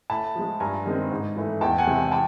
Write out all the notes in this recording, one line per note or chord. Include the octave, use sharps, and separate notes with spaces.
A2 A5 B5
F3 G#3
G2 G#5 A#5
D#3 G#3 C4
G#2
E3 A3
E2 G5 A5
F#5 G#5
C3 E3 G#3
G5 A5